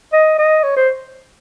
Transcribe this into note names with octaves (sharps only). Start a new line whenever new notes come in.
D#5
D#5
C#5
C5